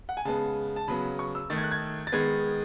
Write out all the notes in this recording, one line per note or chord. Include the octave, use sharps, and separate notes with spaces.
F#5
G#5
C#3 G#3 B3 A5
A5
C#3 F#3 B3 B5
C#6
E6
D#3 A3 A6
G#6
F#6
G#6
A6
D#3 G#3 B3 G#6